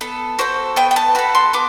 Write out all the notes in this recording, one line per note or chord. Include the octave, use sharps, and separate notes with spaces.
B3 A4
F#4 A4 C5
B3 G5
G5
A5
F#4 A4 B5
C6
B3 D6